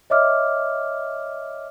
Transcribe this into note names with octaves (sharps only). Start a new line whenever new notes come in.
C#5 D#5 E5 D6 F6